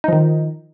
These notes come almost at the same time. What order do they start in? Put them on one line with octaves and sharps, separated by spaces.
D#4 F3 D#3